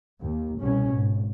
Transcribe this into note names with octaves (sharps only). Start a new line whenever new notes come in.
D#2
C2 B2 C#4
G#1